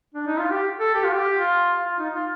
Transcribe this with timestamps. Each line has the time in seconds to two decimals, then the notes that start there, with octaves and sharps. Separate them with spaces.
0.14 D4
0.27 D#4
0.39 F4
0.51 G4
0.80 A4
0.95 G4
1.04 F4
1.12 G4
1.40 F4
1.84 F4
1.99 D#4
2.15 F4